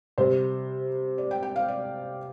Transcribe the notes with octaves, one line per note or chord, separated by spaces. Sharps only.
C3 G3 C5
D5
G5
G5
F5
D5